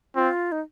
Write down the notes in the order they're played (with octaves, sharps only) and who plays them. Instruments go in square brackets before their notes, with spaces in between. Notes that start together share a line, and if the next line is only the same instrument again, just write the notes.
[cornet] C4 [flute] F4
[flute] D#4